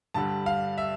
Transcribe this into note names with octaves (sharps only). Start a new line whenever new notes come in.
G2 D3 G3 A5
F5
E5